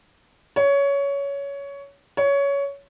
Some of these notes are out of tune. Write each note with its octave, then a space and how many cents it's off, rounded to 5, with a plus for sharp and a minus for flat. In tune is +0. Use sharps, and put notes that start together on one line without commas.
C#5 +15
C#5 +15